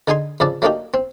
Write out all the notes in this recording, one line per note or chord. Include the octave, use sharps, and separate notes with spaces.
D3 D#4 G#4 G#5 C6
F2 C#3 D4 D5
F#3 A3 A#3 D4 D#4 G4
C4